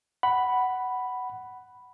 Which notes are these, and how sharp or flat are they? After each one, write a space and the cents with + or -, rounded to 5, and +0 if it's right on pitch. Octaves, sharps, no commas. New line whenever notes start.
F#5 +10 B5 +0